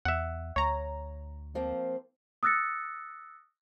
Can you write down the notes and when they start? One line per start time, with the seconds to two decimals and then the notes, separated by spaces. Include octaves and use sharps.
0.05 E2 E5 F#5
0.56 D2 C#5 A#5
1.55 F3 A#3 C4
2.43 D#6 E6 F#6 A6 A#6 C#7